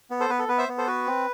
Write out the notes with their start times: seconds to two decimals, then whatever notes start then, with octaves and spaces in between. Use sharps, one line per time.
0.11 B3
0.20 A4 C5
0.30 B3 B4
0.39 A4
0.49 B3 B4
0.58 C5 E5
0.68 B3
0.78 A4 C5
0.87 F#4 B4
1.07 C4